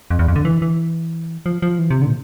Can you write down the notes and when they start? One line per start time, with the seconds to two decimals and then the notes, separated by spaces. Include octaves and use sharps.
0.10 F2
0.19 E2
0.28 F2
0.36 D3
0.45 E3
0.62 E3
1.46 F3
1.62 F3
1.79 E3
1.90 C3
2.02 D3
2.07 A#2